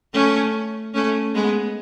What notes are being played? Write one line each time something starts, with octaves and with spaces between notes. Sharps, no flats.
A3 C#4
A3 C#4
G#3 B3